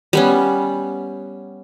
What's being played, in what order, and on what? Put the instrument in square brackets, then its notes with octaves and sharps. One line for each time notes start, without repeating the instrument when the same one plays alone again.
[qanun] G3 B3 C#4